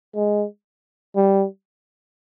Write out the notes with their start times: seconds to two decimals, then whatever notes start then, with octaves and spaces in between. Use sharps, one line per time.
0.16 G#3
1.16 G3